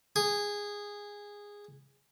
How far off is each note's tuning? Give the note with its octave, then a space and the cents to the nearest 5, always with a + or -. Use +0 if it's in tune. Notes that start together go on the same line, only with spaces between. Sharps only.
G#4 -15